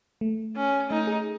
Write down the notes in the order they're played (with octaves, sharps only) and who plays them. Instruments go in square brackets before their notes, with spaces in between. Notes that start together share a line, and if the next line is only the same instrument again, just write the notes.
[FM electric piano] A3
[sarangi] C#4
[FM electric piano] A3 [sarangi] D#4
[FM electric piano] G#4